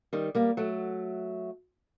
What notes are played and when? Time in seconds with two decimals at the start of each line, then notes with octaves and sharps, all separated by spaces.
0.13 D#3 G3
0.35 G3 A#3
0.57 F#3 A3